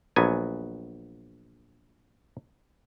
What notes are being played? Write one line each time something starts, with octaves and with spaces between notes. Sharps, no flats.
A#1 F#3 B3 G#5